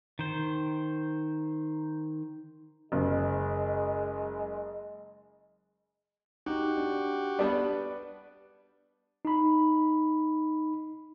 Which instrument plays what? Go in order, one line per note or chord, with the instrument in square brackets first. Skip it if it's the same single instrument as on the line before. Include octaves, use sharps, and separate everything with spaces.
[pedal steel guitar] D#3 C5
[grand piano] F#1 [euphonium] G#3
[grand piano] D#4 [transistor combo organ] F#4 G4
[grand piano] D4
[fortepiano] G3 B3 D4 [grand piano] B4 D5
[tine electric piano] D#4 B5